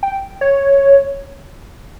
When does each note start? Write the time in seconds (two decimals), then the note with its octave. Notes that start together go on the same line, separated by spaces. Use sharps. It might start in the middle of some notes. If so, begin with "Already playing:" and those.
0.03 G5
0.41 C#5